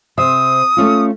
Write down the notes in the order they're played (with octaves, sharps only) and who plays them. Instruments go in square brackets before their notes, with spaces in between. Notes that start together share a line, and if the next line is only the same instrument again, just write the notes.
[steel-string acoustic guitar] C3 C5 E5 [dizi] D#6
[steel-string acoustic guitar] A3 C#4 F4